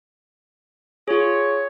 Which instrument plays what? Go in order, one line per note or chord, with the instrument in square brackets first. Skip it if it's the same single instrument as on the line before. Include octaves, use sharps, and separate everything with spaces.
[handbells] F4 G#4 [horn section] C#5